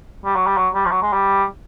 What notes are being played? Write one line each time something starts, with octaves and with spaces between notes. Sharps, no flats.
G3
F#3
G3
F#3
G3
F3
F#3
G#3
G3